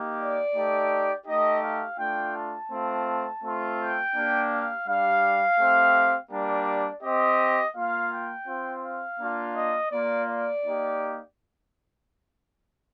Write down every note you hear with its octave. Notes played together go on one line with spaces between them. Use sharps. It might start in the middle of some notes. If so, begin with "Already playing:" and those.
Already playing: A#3 D#4 G4
D5
A3 D#4 G4
A3 D#4 G4 D#5
F5
A3 D4 F4 G5
A5
A3 C4 F4
A3 C4 F4
G5
A#3 D4 G4
F5
G3 D4 G4 F5
A3 C4 G4
G3 A#3 D4 G4 D5
C4 G4 D#5
A#3 F4 F5
G5
C4 F4
F5
A#3 D4 F4
D#5
A#3 F4 D5
D5
A#3 D#4 G4